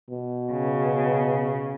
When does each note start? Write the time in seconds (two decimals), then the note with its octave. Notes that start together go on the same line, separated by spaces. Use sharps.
0.10 B2
0.53 C#3